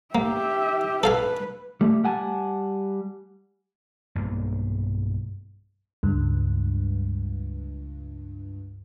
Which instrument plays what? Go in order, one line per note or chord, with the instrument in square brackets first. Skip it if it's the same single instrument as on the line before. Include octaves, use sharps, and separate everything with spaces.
[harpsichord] A#3 [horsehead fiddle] G4 E5
[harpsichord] A4 F5 G#5 [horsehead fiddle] B4
[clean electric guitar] G3 A3
G3 F#5 G#5 A5
[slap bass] B1 G2 A#3
[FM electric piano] C#2 G2